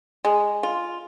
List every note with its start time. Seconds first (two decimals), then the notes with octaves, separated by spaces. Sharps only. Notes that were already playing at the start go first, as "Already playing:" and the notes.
0.25 G#3
0.63 F4